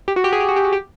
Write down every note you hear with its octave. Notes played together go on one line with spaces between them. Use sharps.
G4
F#4
G4
G#4
G4
F#4
G4
F#4
G4